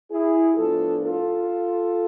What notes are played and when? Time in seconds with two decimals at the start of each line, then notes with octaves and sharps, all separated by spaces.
0.11 E4 G#4
0.56 A2 F3 B3 D4 F4 A4
1.03 F4 A4